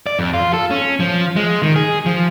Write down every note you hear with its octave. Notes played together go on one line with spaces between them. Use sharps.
D5
F2
F4
A4
C#4
F3
G#3
D#3
G#4
F3